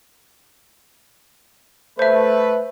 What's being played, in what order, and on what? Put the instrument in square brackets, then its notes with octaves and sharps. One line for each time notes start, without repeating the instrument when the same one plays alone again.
[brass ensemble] A3 B4 [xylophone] C5 E5